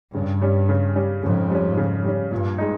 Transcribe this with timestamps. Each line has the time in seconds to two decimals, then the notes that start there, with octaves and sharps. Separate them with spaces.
0.15 G2 C#3
0.42 G3 C#4
0.69 C#3
0.96 G3 C#4
1.23 F2 G#2 C#3
1.50 G3 C#4
1.77 C#3
2.04 G3 C#4
2.31 G2 A#2
2.58 G#3 D#4